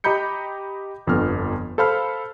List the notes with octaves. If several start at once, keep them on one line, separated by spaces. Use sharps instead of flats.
G4 D#5 A#5 B5 G6 C#7
G1 F2 D3 B3 F6
A4 C5 F5 B5 F6